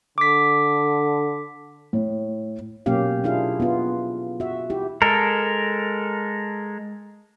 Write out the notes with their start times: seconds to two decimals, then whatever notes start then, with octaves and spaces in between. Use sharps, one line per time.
0.18 D3 D6 B6
1.93 A2
2.86 B2 F#3 A#3 C#4 G4 F5
3.24 D4 E4 F4 G#4 F5
3.60 B3 F4
4.40 F#4 E5
4.70 E4 G4
5.02 G#3 A4 A#4